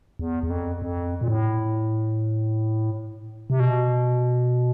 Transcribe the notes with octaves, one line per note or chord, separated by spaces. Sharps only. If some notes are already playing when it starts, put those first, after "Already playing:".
E2
E2
F2
F2
A#2
A2
C3
B2